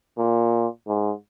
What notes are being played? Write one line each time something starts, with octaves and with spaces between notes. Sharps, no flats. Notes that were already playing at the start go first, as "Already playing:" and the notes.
A#2
G#2